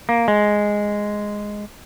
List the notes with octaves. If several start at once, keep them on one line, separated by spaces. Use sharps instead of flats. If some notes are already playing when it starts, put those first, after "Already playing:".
A#3
G#3